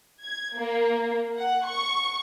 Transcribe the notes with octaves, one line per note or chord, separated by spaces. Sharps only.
G#6
A#3
F#5
C#6